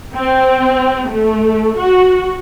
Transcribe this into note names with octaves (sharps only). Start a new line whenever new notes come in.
C4
A3
F#4